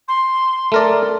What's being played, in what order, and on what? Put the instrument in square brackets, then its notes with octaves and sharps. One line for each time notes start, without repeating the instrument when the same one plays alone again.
[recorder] C6
[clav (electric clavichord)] A3 A#4 D5